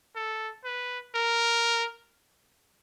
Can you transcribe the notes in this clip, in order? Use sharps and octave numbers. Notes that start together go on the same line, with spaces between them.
A4
B4
A#4